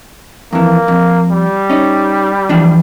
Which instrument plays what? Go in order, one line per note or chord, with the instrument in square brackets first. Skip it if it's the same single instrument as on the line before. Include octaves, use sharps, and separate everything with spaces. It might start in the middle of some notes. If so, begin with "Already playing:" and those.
[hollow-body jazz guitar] F2 E3 [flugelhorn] A#3
[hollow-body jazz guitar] F2
[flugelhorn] G3
[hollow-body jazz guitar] C#4 D#4
E3 F3 D4